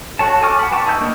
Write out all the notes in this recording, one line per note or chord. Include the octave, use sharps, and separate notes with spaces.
F#4 A4 C#5 A5
G#5 A5 C#6 D6 F6
F#5 B5
B4 G5 A5 C#6 D6
D#4 E4 G6
A#3 D4 A#4 D#5